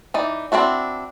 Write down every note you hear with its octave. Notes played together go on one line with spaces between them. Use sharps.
E3 D#4 D5
C4 D4 E4 F#4